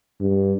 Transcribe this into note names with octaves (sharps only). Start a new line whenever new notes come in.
G2